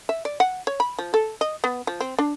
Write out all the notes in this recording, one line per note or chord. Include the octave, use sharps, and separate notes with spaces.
E5
D5
F#5
C#5
B5
F3
A4
D#5
B3
F3
C4
D4